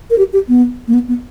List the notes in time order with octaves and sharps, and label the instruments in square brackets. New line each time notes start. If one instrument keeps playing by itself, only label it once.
[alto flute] A#4
G4
G4
B3
A#3
B3
B3